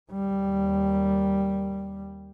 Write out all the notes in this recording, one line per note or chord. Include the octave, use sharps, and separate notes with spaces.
D#2 G3